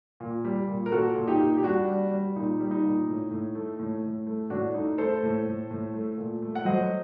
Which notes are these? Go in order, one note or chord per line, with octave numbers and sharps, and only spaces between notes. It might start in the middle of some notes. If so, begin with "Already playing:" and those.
A#2
G3
A#2
A#4
A#2 F#4 A4
A#2
D#4 G4
A#2
G4
G3 D4 F#4
G3
G3
A#2 D#4
G3
D#4
A#2
A2
A2
A3
A2
A2
A3
A2 D4 F#4
A3 D#4
A3 A4 C5
A2
A2
A2
A3
A#2
A3
F#5
F#3 C5 D#5